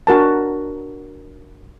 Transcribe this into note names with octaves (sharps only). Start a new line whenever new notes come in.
D4 F#4 A#4 A5